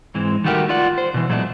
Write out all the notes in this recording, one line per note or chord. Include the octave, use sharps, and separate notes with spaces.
G#2 E3 G#3 C4
D#3 G3 A3 F#4 G4 A#4
F4 D5 F#5
C5
B2 E3
A#2 F#3 G#3 A3 B3 D4